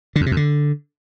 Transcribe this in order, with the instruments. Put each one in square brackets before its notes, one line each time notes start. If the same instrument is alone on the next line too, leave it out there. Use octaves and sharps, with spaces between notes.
[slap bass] D3
F2
C3
F2
D3